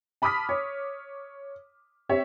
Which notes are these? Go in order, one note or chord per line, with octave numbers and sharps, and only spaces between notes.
A5 B5 D6 D#6 F6 B6
C#5
C4 G4 C#5 E5